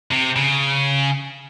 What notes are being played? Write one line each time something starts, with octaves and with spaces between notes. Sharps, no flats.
C3
C#3